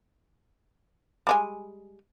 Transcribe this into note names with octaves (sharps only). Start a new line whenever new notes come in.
G3 G#3 G#5